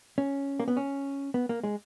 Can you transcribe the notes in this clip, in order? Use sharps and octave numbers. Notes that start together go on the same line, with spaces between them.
C#4
A#3
B3
C#4
B3
A#3
G#3